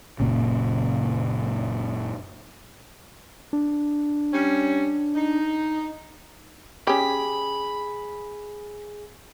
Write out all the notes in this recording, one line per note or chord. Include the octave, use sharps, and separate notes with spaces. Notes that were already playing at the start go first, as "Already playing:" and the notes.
F#1 A#2 C#3
D4
G3 C#4
D#4
C#4 G4 G#4 B5